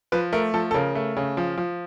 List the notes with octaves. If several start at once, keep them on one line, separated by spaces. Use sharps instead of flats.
F3 B4
A3 A#4
F3 A4
A4
C#3 A#4
A3
C#3
F3
F3